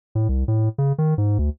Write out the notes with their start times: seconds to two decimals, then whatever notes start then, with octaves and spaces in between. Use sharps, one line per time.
0.15 A2
0.29 C2
0.48 A2
0.78 C#3
0.98 D#3
1.18 G#2
1.39 D2